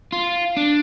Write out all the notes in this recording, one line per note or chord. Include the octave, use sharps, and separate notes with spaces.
F4
D4